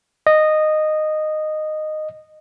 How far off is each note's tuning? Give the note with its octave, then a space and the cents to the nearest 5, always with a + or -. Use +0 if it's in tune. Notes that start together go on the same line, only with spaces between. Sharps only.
D#5 -10